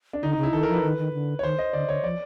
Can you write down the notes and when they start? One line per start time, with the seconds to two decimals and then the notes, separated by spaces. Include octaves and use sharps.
0.13 D4
0.23 D3 D#4
0.33 C#3 D#4
0.43 E4
0.53 D#3 A4
0.63 A#4
0.68 F3
0.73 B4
0.83 D#3
0.98 D#3
1.13 D3
1.39 C#5
1.43 D#3 C5
1.59 D#5
1.73 D3 D5
1.88 D3 C#5
2.04 F3 D5